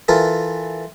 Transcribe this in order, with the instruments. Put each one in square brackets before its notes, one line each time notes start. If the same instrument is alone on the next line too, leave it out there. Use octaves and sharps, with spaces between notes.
[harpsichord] E3 F4 A4 A#4